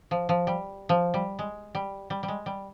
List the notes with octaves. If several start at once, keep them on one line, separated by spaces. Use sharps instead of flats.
F3
F3
G3
F3
G3
G#3
G3
G3
G3
G#3
G3